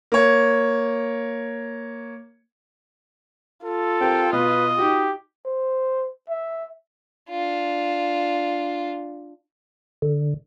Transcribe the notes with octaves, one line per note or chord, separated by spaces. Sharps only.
A#3 C#5
F4 A4
C4 G4 A#4 G5
B2 B4 D#5
D#4 F#4 G4
C5
E5
D4 F4
D3